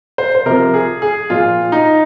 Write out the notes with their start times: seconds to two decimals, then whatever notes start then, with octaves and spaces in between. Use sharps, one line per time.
0.18 C5
0.35 C5
0.46 C3 F3 A#4
0.74 G#4
1.02 G#4
1.30 A#2 F3 F4
1.72 D#4